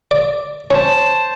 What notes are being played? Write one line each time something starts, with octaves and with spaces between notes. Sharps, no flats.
D5
C#4 C5 A5